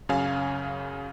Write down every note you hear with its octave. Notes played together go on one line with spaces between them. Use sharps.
F#2 C#3 C#5 F5 G#5